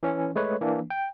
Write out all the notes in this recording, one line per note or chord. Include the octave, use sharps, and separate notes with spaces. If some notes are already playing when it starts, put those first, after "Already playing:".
E3 C#4
G#3 A3 B4 C#5
E3 A#3 D4
G5